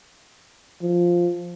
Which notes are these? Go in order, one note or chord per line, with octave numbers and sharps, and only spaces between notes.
F3